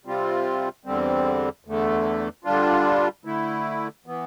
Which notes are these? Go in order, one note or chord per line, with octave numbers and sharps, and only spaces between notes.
C3 G3 C4 F4
E2 D3 G3 C4
E2 D3 A3
D3 G3 D4 F4
D3 A3 E4
E3 B3